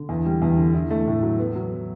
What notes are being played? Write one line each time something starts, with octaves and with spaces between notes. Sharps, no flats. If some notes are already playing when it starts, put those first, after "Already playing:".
Already playing: D3
E2
G3
E2
D3
E4
A3
A2
F#3
B3
F#3